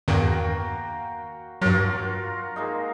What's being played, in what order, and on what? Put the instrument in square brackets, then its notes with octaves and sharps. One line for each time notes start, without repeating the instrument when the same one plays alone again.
[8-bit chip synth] E2 G2 D#3 [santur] A#3 F#4 G5
[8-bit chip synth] G2 F#3 [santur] F4 F#4 A#4
[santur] G#3 A#3 D#4